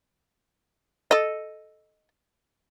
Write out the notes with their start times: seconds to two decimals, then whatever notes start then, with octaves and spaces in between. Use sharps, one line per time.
1.11 A4 D#5